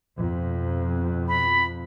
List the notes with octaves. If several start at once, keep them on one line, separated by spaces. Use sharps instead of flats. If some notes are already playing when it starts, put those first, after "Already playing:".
F2 B2
B5